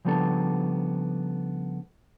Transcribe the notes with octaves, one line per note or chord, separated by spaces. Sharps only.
C#3 F3 G3 B3 D4 A4